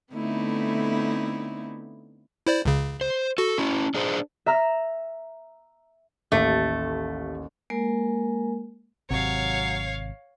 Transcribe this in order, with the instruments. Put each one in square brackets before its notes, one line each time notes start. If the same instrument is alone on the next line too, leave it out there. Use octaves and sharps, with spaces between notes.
[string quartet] D3 A3 B3 C4 D#4 E4
[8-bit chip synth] E4 C5 D5
C#2 C#3
[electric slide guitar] C5
[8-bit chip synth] F#4 [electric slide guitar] A4
[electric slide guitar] C#4 E4
D4 G#4 C5
[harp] E5 A#5 F6
[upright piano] A1 D#2 [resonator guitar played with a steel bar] A3
[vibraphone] G#3 A#3 A#4 G#5
[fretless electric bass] G#1 C3 [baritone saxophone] F#3 [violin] C#5 F5